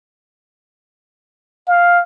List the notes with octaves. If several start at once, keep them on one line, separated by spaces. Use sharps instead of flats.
F5